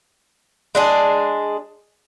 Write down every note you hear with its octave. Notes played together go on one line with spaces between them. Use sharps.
G#3 D4 G#4